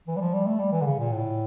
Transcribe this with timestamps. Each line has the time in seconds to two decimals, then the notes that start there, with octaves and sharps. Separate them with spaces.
0.07 E3
0.16 G3
0.21 F3
0.34 G3
0.46 A3
0.59 G3
0.72 E3
0.81 D3
0.86 C#3
0.99 A#2
1.11 A2